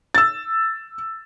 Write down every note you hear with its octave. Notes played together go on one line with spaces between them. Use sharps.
E6 A6